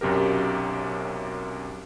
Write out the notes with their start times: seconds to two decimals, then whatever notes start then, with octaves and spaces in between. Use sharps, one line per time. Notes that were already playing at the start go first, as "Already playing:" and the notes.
0.01 B1 F#2 C3 G4 A#4